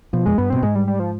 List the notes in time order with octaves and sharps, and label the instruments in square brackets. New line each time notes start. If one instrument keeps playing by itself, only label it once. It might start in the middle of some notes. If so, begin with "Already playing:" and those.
[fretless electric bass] B2 [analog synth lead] F3
[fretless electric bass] F2 [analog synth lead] G#3
[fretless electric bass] G2 [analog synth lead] B3
[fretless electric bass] B2 [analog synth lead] C4
[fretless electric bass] G#2 [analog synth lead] G#3
[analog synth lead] G3
G3
F3